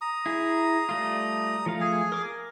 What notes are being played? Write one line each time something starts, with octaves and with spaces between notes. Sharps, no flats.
A#5 D#6
E4 G#4
G3 A3 F4
F3 A3 F5
G#4 G#5
A#4 D6